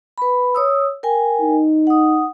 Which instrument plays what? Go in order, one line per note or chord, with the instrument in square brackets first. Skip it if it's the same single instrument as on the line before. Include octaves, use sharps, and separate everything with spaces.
[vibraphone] B4 B5
C#5 D#6 E6
A#4 G5 G#5
[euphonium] D#4
[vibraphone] F#5 D#6